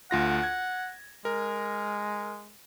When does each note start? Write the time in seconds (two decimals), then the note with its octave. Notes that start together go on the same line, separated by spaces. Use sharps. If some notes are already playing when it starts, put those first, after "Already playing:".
0.11 D2 F4 F#5 A#6
0.43 G#6
1.25 G#3 A#4